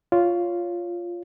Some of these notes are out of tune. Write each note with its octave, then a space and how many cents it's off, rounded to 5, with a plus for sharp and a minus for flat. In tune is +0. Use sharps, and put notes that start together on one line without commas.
F4 +0 C#5 +15